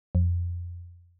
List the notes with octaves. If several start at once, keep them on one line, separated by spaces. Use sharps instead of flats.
F2